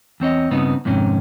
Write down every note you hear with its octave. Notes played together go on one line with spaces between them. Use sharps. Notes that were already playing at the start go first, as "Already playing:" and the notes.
E2 C4 C#5 D#5
G2 C#3 B3 C4 D#4
F2 G#2 C3 D#3 C#4